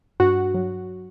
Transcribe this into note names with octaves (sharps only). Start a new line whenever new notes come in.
G2 F#4
F#3